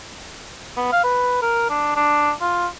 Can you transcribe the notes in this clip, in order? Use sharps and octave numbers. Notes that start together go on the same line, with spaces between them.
B3
F5
B4
A#4
D4
D4
F4